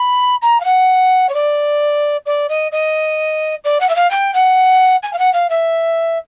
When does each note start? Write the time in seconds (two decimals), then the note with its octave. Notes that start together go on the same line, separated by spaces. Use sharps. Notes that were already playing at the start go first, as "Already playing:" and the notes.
Already playing: B5
0.42 A#5
0.60 F5
0.65 F#5
1.29 C#5
1.34 D5
2.26 D5
2.49 D#5
2.72 D#5
3.64 D5
3.80 F#5
3.89 E5
3.96 F5
4.11 G5
4.34 F#5
5.03 G#5
5.13 F5
5.19 F#5
5.34 F5
5.50 E5